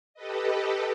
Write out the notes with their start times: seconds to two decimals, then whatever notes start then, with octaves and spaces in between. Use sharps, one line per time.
0.14 G4 A4 B4 D#5